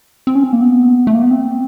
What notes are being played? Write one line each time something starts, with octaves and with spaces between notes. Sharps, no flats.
C4
C#4
C4
A#3
B3
A3
A#3
B3
C4